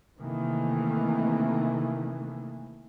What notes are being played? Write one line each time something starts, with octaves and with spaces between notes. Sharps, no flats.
C3 D#3 E3 A3 A#3